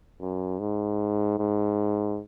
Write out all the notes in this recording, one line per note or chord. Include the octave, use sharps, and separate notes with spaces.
F#2
G#2
G#2